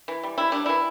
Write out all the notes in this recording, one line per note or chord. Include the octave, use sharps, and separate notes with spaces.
E3
G3
G3 E4
G3 D4
E3 E4